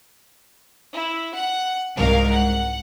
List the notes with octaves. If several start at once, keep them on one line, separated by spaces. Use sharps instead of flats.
E4
F#5
C2 G#2 A#4 F5
F#5